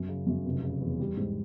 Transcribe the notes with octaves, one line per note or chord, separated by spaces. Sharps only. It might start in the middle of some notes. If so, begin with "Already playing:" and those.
Already playing: F#2
C#3
F#2
F1
C#3
E2
G3
G#2